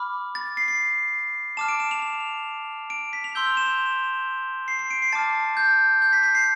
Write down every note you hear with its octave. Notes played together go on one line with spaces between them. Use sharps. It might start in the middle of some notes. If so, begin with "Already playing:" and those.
Already playing: B5 D6 F6
A6
C7
C7
A5 D6 F6 E7
D7
E7
F7
F7
D7
B6
F7
C6 E6 G6 G7
F7
E7
C7
C7
D7
C7
A5 D6 F6 A6
G6
G6
B6
B6
C7